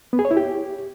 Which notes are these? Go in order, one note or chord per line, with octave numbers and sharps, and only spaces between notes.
B3
G#4
C#5
E4
G4